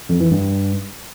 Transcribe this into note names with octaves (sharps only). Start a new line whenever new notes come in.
F2
E3
G2